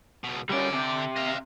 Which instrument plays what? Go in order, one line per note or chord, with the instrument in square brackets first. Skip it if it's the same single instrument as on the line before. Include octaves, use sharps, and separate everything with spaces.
[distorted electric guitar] C#2 B2
[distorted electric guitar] D3 D5 [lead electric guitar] G3 C#4
[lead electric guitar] C3
[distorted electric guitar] D#5 F5